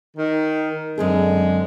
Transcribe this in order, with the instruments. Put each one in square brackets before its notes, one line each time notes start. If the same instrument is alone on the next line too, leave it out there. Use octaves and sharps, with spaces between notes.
[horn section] D#3
[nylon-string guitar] F#2 C4 G#4 [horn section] D3 G#3